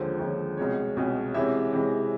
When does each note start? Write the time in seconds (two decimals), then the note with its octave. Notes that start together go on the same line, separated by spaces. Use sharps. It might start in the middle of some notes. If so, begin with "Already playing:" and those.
Already playing: D#2 D3 F3 G#3 C#4 C5
0.19 D#2 D3 F3 G#3 C#4
0.57 C2 B2 G#3 C#4 C#5
0.96 C2 B2 G#3 C#4
1.34 C3 E3 G#3 C#4 E5
1.72 C3 E3 G#3 C#4